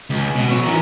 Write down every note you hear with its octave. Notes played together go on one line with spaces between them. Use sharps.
C#2
B2
B2 C#5
E3 A#4